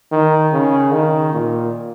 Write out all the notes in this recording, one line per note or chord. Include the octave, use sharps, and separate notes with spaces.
D#3
C#3
D#3
A#2